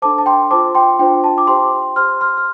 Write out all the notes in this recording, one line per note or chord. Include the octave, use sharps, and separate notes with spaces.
D4 A4 C5 A5 D6
A5
G5 C6
F4 C5 A5 D6
G5 C6
D4 F4 C5 G5
A5
D6
G4 C5 G5 C6
G4 C5 C6 F6
C6 F6
F6